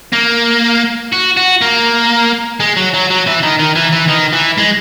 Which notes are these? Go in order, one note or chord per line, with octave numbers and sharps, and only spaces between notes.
A#3
F#4
F#4
A#3
G#3
F#3
F#3
F#3
E3
D#3
D#3
E3
E3
D#3
E3
G#3